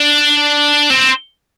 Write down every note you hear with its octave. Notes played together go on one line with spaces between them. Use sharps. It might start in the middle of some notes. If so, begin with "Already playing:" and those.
Already playing: D4
C4